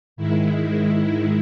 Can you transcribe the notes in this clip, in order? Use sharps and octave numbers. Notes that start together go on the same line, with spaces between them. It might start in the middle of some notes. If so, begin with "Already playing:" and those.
G#2 D#3 G#3 E4